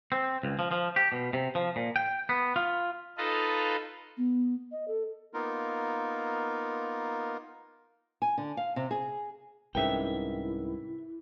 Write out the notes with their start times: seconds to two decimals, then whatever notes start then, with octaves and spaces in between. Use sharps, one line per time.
0.12 C4
0.43 C#2
0.59 F3
0.71 F3
0.96 G4
1.12 B2
1.33 C3
1.55 F3
1.76 A#2
1.96 G5
2.29 B3
2.56 F4
3.18 D#4 F4 A4 B4 D#5 F5
4.17 B3
4.72 D#5
4.88 A4
5.34 A#3 B3 D#4 F4 A#4
8.22 G#5
8.38 D3
8.57 F5
8.76 C3
8.91 G#4
9.75 C2 G#2 C#4 E4 A#4 B4 E5 G5